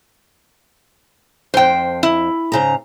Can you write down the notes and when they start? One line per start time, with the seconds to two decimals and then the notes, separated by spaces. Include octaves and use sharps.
1.54 F2 G#2 C5 G5
2.03 E4
2.52 G#2 C#3 A#5